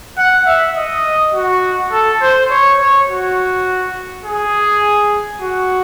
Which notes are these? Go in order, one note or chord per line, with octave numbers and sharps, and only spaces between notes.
F#5
E5
D#5
F#4
A4
C5
C#5
C#5
F#4
G#4
F#4